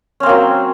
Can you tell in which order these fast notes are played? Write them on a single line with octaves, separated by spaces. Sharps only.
C#4 C4 A#3 F#3